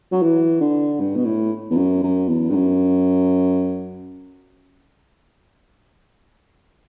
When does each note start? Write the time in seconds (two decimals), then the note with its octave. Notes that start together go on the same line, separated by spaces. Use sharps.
0.12 F#3
0.22 E3
0.61 D3
1.00 G2
1.16 B2
1.25 A2
1.70 E2
1.77 F#2
2.03 F#2
2.28 E2
2.50 G2
2.54 F#2